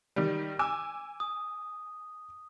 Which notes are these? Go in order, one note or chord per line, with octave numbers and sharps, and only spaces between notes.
D#3 G3
G#5 D6 E6
D#6